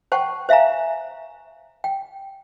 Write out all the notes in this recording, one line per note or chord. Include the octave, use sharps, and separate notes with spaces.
C5 F#5 G5 A5 C#6
C5 E5 F5 G#5 A#5
G5